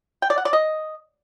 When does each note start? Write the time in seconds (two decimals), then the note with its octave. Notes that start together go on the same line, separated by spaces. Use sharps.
0.22 G5
0.30 D5
0.38 F#5
0.45 D5
0.53 D#5